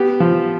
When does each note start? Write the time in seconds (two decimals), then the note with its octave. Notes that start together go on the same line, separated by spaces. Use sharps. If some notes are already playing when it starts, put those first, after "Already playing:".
Already playing: B3 G4
0.20 F3